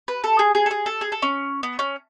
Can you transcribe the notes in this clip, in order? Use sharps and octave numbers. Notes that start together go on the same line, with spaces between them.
B4
A4
G#4
G#4
A4
G#4
A4
G#4
A4
C#4
B3
C#4